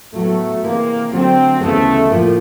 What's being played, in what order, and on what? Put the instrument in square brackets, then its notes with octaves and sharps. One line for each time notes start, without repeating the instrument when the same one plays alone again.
[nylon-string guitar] A2 F#3 B3 [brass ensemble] A3
[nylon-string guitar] C3 E3 G#3 [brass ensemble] A#3
[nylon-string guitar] D3 F#3 A3 D4 [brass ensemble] C4
[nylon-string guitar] D2 C#3 E3 G#3 B3 [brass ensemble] A3
[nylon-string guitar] A2 F3 A#3